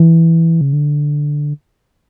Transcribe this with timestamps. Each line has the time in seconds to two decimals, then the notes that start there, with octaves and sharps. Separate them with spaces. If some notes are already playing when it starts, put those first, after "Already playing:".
Already playing: E3
0.61 C#3
0.73 D3